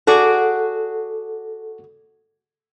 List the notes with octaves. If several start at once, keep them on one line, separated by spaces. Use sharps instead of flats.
F#4 G#4 A4 D5